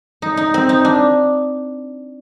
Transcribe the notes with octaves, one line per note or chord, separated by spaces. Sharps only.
D#4
D#4
C4
D#4
D4